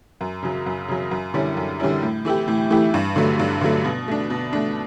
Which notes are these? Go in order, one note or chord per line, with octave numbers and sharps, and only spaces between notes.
F#2
C#3 F#3
F#2
C#3 F#3
F#2
D3 G3 C#4 E4
F#2
D3 G3 C#4 E4
A2
E3 A3 E4 G4
A2
E3 A3 E4 G4
G2
D3 F#3 A3
G2
D3 F#3 A3
B2
A3 D4
B2
A3 D4